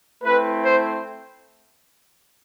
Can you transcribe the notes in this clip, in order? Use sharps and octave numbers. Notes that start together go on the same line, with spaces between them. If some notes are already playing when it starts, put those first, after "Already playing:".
A3 C4 E4 B4
C5